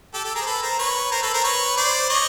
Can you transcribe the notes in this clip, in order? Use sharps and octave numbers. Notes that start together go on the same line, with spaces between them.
G4 A4
G4 A4
G#4 A#4
C5
A4 B4
A#4 C5
B4 C#5
A#4 C5
A4 B4
A#4 C5
B4 C#5
C5 D5
C#5 D#5